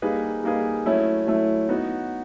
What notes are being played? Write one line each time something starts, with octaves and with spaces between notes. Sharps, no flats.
G3 A#3 D#4 G#4 B4
G3 A#3 D#4 G#4 B4
F#3 A3 C#4 E4
F#3 A3 C#4 E4
B3 D#4 F#4